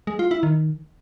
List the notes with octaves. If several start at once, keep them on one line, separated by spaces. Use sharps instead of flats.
G#3
F4
E4
D#3